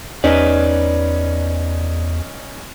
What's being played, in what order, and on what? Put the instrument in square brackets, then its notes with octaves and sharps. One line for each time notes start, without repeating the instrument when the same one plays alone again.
[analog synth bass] E2 [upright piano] C#4 D#4 [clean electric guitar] B4 D5